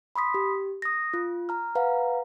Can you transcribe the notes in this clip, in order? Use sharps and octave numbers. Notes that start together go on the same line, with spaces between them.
B5 C6 D#6 B6
G4
D#6 A#6
F4
A#5 F6
B4 F5 F#5 A#5